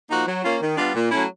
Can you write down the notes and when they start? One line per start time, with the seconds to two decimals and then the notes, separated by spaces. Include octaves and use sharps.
0.10 F3 A#3 D#4 F#4
0.27 F#3
0.43 A#3 C#4 F4
0.61 D#3
0.77 G3 B3 D4 F4
0.94 A#2
1.11 F#3 A3 C#4 E4